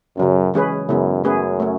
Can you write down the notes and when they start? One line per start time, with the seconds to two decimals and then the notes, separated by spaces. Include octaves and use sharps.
0.17 F#2 C#3 F#3 C#4
0.54 E3 G#3 C#4 G#4 B4
0.89 F#2 C#3 G#3 B3 E4
1.24 F#2 A3 C#4 G#4 B4
1.60 A3 C#4